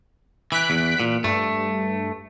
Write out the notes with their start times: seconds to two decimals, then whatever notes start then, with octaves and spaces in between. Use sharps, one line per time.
0.52 E3 F#6 B6 D7
0.70 E2
1.00 A#2
1.24 G2 A3